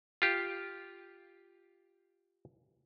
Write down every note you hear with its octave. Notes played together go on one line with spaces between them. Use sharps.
F4 G4